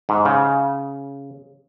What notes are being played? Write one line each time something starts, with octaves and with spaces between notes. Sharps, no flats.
G#2
C#3